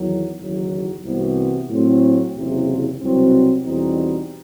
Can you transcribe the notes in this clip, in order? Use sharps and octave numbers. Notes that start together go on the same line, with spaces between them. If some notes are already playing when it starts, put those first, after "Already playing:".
Already playing: E2 D#3 F#3
F#1 E2 D#3 F#3
C2 C3 E3 B3 F#4
A2 F#3 A3 C4
F#1 E2 C3
C2 B2 F#3 C4
E2 B2 G3 C4 D#4